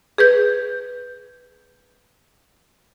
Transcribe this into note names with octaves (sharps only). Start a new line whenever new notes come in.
G#4 B4 G6